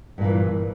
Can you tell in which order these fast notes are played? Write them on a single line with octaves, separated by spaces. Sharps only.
G2 A#2 E3